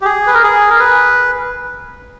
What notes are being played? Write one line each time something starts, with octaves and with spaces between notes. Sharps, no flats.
G4
G#4
B4
A#4
G#4
A#4
B4